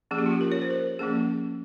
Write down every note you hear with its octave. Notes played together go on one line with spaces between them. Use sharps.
F3 A#3 C#4 G#4
G4
F4
G4
A#4
C#5
C5
A#4
F3 A#3 C#4 G#4